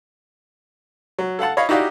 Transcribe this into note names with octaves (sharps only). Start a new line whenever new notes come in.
F#3
A4 F5 F#5 A5
C#5 D#5 F5 B5
D#4 E4 F#4 G4 D5 F5